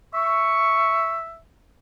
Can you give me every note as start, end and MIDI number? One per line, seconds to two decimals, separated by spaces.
0.14 1.38 76
0.14 1.17 85